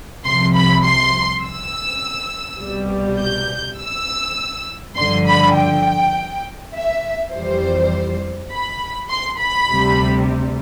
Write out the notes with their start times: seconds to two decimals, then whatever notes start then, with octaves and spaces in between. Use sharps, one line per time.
0.25 C2 C3 F3 C6
0.55 B5
0.84 C6
1.44 E6
2.62 C2 B2 G3
3.20 G6
3.80 E6
4.97 G2 D3 F3 C6
5.27 B5
5.56 G5
6.75 E5
7.33 F2 E3 G3 C5
8.52 B5
9.10 C6
9.40 B5
9.69 D2 C3 G3